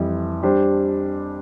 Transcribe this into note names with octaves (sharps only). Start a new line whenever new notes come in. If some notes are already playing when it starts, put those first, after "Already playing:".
Already playing: F2 E3 G3
G3 D4 G4 C5